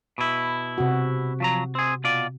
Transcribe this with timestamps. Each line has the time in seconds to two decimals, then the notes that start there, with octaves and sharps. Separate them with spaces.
0.18 B2 E4
0.78 C3 F#4
1.40 F3 F#3 A#5
1.75 C4 G#4
2.04 B2 F4 D5